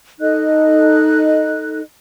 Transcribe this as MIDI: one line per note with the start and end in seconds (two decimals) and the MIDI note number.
0.20 1.80 63
0.20 1.80 69
0.20 1.80 75
0.20 1.80 90